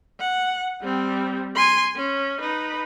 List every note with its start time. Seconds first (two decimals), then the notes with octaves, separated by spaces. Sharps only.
0.20 F#5
0.82 G3 C4
1.55 G#5 C6
1.96 C#4
2.41 D#4 B4